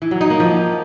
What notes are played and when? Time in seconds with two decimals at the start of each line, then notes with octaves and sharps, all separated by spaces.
0.02 E3
0.11 F#3
0.21 D#4
0.30 A#3
0.40 F3